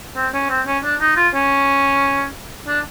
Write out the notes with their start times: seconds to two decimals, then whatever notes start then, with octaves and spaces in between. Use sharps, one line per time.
0.17 C4
0.34 C#4
0.50 C4
0.67 C#4
0.84 D4
1.01 D#4
1.17 F4
1.34 C#4
2.68 D4